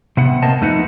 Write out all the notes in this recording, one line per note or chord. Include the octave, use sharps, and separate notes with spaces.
C3 B3 F#5
A#3 C4 D#5 A5
F2 A3 D#4 B4 F#5